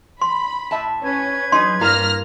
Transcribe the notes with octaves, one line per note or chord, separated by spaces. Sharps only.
B5 C6
A2 E5 A5
C#4 B4 G#6
F#3 D#4 G#4 C6
G2 A#3 E4 F6 A#6